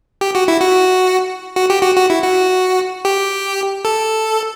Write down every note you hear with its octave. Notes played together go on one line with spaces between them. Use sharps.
G4
F#4
E4
F#4
F#4
G4
F#4
F#4
E4
F#4
G4
A4